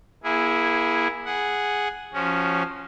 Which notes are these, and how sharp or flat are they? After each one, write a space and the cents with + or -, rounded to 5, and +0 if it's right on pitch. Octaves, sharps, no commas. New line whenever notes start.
A#3 +30 E4 +0 G#4 -10
G#4 +0 F#5 +0
F3 +0 C#4 +0 F#4 +30